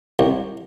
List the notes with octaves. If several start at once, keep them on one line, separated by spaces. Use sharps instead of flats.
C2